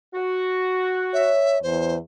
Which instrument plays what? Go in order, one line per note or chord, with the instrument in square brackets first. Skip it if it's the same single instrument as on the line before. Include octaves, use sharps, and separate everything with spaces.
[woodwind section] F#4
[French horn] C#5 [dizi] E5
[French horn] E2 [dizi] C5